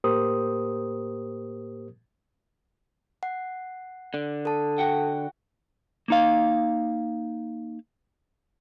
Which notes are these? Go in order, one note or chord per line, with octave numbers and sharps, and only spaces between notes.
A2 A#3 G4 A#4 C5 D#6
F#5
D3
A4 A5
F#4 F#5 G5
A#3 D#4 F5